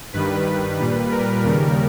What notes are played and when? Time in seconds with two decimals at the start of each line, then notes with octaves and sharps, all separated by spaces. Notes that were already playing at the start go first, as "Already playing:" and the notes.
0.13 G2 D#3 G3 B4
0.46 B4
0.79 A#2 G3
1.12 A#4
1.44 D#2 C#3 G3